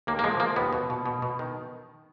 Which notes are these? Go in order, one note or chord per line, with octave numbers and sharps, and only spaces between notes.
D#2 A#3
A#3
F3 G#3
F3 A#3
D#2 B3
B2
B2
B2
B2
D#3